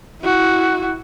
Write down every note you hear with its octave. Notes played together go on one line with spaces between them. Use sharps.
E4 F#4